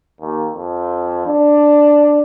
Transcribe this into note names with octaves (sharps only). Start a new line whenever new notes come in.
D#2
F2
D4